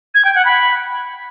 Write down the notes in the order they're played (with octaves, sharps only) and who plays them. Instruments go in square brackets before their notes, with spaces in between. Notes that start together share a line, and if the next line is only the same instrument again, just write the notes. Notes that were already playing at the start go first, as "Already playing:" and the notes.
[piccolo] G#6
G5
F#5
B5